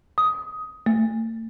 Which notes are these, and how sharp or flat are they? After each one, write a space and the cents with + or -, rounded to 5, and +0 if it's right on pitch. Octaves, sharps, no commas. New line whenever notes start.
D#6 +10
A3 +40